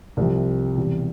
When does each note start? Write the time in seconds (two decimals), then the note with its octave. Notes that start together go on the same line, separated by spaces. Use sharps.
0.17 C2 C3 F3
0.76 E1 E2 C3 G3